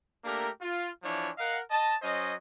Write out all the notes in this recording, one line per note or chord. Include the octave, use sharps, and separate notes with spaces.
A3 A#3 D4 G4 A#4
F4
E3 F3 D4 E4 C#5
A#4 D#5 F5 F#5
D#5 A5
F#3 C#4 C5 D#5